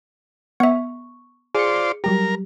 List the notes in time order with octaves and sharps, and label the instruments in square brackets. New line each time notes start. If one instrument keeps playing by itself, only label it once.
[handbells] B3 E5 [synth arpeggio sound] C#6
[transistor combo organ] F4 C5 D5 [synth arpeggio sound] G#4 C#7
[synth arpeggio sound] F#3 G3 G4 [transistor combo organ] A#4